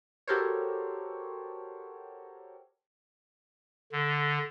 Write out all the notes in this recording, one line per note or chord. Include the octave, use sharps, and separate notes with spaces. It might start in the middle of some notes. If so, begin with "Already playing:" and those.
F#4 G4 A4 A#4 C5 C#5
D3